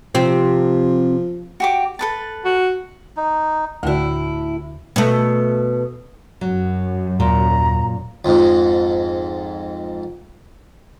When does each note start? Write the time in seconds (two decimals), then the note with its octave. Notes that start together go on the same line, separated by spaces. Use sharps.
0.15 C3 F3 C4
1.60 F#4 G4 D6
1.99 A4 B4 A5
2.45 F#4
3.17 D#4
3.83 D2 A2 D3 E4 F#4
4.96 B2 A3
6.41 F#2 F#3
7.20 D#2 A#2 A#5
8.25 F2 G#2